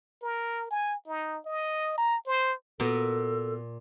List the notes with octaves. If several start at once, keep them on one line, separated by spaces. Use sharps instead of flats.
A#4
G#5
D#4
D#5
A#5
C5
A#2 B3 F#4 A4 A#4